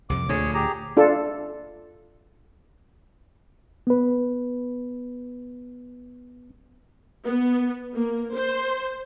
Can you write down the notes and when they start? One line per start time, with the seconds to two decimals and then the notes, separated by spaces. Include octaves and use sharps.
0.10 C2 F2 D6
0.29 D2 A#2 D3 G#4 C#5
0.54 G4 G#4 A#5
0.97 D4 F4 A4
3.87 B3 B4
7.26 B3
7.95 A#3
8.35 C5